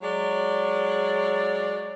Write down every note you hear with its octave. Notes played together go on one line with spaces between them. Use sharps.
F#3 G#3 D5